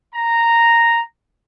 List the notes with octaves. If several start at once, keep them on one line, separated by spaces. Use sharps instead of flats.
A#5